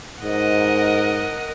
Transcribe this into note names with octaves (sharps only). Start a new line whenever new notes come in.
G#2 A#4 D#5 F#5